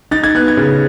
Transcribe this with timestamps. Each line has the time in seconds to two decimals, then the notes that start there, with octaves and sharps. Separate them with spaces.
0.11 D#4 A6
0.24 G#6
0.35 B3 F#6
0.48 G#6
0.57 C#3